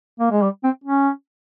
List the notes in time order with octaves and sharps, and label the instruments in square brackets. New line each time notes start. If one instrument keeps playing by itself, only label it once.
[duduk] A#3
G#3
G3
C4
C#4